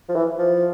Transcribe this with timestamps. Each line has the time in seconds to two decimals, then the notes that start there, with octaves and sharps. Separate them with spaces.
0.09 F3
0.16 E3
0.39 F3